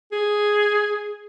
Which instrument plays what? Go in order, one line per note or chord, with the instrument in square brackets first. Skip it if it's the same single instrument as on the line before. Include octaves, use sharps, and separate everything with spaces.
[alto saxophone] G#4